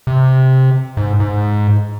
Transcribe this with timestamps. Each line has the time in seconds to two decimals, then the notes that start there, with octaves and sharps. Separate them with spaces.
0.07 C3
0.97 G#2
1.20 G#2